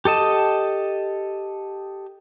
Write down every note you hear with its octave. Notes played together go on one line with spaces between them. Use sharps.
G4 A4 D#5 A5